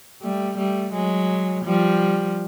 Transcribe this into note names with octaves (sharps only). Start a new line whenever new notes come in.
G3 A3
G3 A3
F#3 G#3
F3 G3